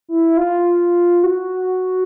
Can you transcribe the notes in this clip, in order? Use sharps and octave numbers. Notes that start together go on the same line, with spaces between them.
E4
F4
F#4